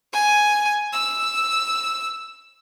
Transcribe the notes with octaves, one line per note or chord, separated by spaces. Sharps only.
G#5
E6